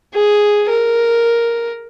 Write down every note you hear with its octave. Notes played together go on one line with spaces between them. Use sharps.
G#4
A#4